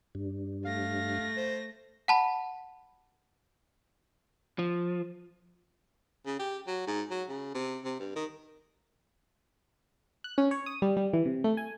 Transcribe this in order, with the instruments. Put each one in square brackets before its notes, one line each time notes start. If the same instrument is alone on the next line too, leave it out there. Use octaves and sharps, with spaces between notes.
[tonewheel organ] G2
[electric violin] A3 A#6 [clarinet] F5
[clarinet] C5
[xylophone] F#5 A5 B5
[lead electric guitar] F3
[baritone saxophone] C#3
G4
F#3
G#2
F#3
C#3
C3
C3
G2
D#3
[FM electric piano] F#6
C#4
C#5
D#6
G3
G3
E3
C3
A3
G#5